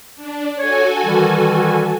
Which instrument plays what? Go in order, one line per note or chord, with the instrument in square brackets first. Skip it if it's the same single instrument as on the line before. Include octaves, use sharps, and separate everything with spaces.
[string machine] D4
[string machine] F#4 A4 G#5 [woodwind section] C#5
[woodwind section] D#3 E3 G3